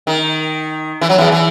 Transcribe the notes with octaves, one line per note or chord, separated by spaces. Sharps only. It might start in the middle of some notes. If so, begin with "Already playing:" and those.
D#3
E3
F#3
E2 E3
E3